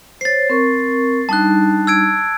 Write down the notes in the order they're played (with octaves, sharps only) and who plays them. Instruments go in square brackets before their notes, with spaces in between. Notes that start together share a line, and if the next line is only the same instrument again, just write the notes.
[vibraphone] C5 C#5 [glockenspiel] A6 C7
[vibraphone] C4 A#4 C#6
[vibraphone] G3 D4 D#4 [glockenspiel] A5 F#6
[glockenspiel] E6 G#6 D7